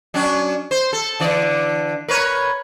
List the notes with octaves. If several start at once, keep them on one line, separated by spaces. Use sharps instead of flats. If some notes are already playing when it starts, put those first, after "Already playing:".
F#3 C#4 D4
C5
A4
D3 E3 D5
A#4 B4 C#5